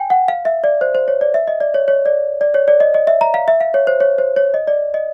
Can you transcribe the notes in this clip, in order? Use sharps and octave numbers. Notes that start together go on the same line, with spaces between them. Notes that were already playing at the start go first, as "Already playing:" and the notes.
Already playing: G5 G#5
F#5
F5
E5
D5
C5
C5
C#5
D5
E5
D#5
D5
C#5
C#5
D5
D5
C#5
D5
D#5
D#5
E5
A#5
F5
E5
F5
C#5
C5
C#5
C5
C#5
D#5
D5
D#5